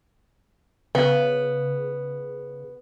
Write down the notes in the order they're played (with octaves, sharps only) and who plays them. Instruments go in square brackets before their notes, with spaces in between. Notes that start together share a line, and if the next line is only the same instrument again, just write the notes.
[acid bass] C#3 [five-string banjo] B3